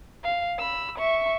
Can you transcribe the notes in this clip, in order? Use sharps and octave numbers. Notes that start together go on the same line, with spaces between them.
F5
B5 E6
E5 C#6